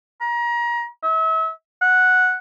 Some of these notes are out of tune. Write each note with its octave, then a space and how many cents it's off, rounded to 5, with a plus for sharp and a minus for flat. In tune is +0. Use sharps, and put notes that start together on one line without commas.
A#5 +30
E5 -35
F#5 -5